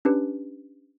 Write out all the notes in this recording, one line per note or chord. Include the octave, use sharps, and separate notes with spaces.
C#4 D4 G4 B4